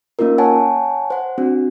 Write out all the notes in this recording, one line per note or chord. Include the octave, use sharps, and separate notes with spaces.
A#3 C#4 D#4 F4 A#4
C#5 F#5 G#5 A5
C5 F#5
C4 D4 F#4